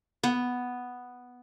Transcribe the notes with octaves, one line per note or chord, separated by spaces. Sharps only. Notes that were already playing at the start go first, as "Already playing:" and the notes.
B3